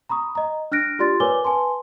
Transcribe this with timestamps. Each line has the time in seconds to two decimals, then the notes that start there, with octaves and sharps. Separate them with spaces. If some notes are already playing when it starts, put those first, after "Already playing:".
0.09 A#5 B5 C#6 D#6
0.35 D#5 A#5
0.72 D4 F6 F#6 A#6 D7
0.99 F4 G4 D5 C6 A6
1.20 A#4 B4 C#5 G#5 D6 G7
1.45 B4 G#5 A5 C6